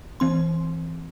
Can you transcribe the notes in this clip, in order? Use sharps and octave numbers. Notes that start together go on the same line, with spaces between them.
E3 C4 C6